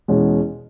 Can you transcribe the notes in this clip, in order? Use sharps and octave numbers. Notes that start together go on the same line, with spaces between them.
E2 B2 G#3 C#4